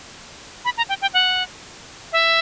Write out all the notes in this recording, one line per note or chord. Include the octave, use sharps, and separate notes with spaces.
B5
A#5
G5
G5
F#5
E5